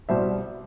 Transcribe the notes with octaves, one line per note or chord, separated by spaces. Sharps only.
C2 B2 G3 C5 E5